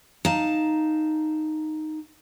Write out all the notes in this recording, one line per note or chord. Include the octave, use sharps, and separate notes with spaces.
D#4 F5 A5